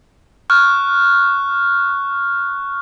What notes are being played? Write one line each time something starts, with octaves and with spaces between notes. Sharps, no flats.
C#6 F6 F#6